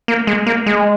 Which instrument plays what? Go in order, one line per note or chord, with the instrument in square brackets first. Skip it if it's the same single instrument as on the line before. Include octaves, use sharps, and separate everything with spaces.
[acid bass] A#3
G#3
A#3
G#3